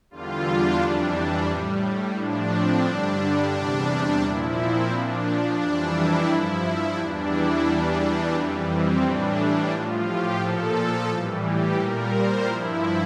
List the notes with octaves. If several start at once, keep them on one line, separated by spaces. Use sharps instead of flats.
E2 D3 G3 F4
D4
F2 E3 G3 D4
A2 G3
A2 F3 D4
C4
G2 D3 G3 D4
E2 C3 G3 D4
D4
A#2 F3 E4
C4
A#2 F3 D4
F2 E3 G3 D4
E4
G2 F3 E4
E2 E3 G3 D4
E4
E2 E3 G3 D4
F2 E3 G3
C4
A2 E3 G3 D4
A2 F3 F4
G4
A#2 F3 A4
A2 E3 G3
G4
A#2 G3 A#4
C5
G2 F3 E4